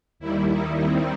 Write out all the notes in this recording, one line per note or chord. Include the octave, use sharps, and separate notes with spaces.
D#2 D#3 G3 E4
D#4
C4